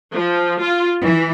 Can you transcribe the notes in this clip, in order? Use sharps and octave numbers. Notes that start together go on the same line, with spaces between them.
F3
F4
E3